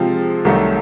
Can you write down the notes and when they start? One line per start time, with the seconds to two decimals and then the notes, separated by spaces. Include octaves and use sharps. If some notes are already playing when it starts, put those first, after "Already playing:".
Already playing: C3 F3 G#3 C4 F4
0.45 C2 C3 D#3 F#3 A3